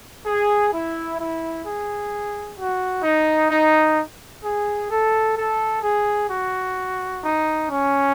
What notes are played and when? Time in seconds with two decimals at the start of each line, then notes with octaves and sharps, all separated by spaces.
0.25 G#4
0.71 E4
1.18 E4
1.64 G#4
2.57 F#4
3.03 D#4
3.50 D#4
4.43 G#4
4.89 A4
5.36 A4
5.82 G#4
6.29 F#4
7.21 D#4
7.67 C#4